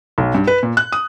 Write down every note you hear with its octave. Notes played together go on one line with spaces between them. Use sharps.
B1
G2
B4
A#2
F#6
D#6